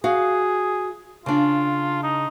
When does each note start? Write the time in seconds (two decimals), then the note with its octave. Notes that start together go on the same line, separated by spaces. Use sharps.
0.04 F#4 G#4 F5
1.26 C#3 D4 F4
2.03 D#4